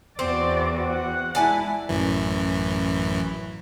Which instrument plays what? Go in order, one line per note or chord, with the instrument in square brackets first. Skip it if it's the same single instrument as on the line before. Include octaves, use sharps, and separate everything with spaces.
[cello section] E2 F#4 [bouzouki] C4 [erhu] D5
[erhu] F#5
[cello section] G#3 E4 [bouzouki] D5 G#5 A5
[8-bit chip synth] A1 F#2 E3